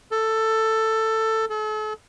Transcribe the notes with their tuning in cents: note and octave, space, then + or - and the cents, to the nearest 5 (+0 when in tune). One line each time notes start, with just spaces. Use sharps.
A4 +10
A4 -40